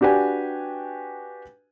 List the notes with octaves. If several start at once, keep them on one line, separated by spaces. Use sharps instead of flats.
D4 F#4 G4 B4 G#5